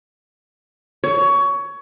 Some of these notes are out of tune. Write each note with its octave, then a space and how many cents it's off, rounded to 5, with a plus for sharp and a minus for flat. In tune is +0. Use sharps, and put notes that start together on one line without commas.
C#5 +20